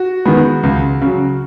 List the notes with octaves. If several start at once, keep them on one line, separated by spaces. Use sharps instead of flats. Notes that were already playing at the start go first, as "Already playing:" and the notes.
Already playing: F#4
D#3 G#3 B3
C#2
C#3 F#3